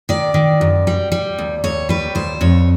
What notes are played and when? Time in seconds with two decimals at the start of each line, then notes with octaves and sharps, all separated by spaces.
0.09 D#3 D5
0.34 D#3
0.61 F#2
0.87 G3
1.12 G3
1.38 D#2
1.64 D#2 C#5
1.89 G3 B4
2.15 D#2 C5
2.41 F2 C#5